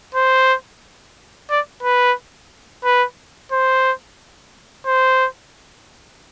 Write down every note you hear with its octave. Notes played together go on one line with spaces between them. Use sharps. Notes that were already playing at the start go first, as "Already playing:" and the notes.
C5
D5
B4
B4
C5
C5